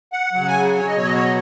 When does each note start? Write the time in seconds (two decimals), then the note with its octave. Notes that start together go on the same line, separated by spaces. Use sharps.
0.13 F#5
0.33 C#3 F#3 F#5
0.48 G#5
0.78 C#5
0.87 D#5
0.93 B2 F#3 C#5
1.05 D#5
1.15 C#5
1.24 D#5